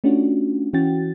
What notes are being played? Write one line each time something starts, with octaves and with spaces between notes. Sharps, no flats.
A3 C#4 D4 F4 F#4
E3 C#4 F#4 G5 A6